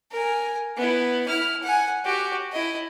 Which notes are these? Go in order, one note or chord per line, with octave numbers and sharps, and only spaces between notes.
A#4 G#5
B3 E4
E4 F6
F#5 G#5
F#4 G4
E4 D#5